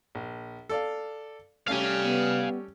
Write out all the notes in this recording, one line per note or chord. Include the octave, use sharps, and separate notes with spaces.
A#1
A4 D5 F5
G3 A3 C#4 G4 F5 G#5
B3